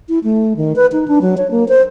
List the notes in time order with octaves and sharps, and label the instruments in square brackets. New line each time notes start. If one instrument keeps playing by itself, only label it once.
[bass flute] E4
A3
D#3
B4
D#4
D4
F#3
C#5
A#3
C5